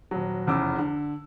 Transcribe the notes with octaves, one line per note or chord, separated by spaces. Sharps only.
D#1 F#3
F1 E2 C#3 D6 E6
D3